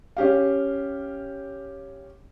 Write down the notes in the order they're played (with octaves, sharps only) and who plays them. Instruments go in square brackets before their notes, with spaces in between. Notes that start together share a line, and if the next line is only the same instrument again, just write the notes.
[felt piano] C#4 G4 F5